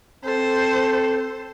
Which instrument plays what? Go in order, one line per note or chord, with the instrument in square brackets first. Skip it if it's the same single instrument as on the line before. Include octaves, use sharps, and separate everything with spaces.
[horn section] C4 A4 [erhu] C5